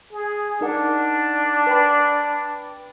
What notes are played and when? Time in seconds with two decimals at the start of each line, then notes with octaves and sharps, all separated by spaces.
0.12 G#4
0.61 D4 D#4 A#4 F#5
1.67 B4 G5 B5